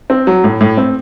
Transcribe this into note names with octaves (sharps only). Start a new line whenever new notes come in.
C4
F#3
A2
A2
C4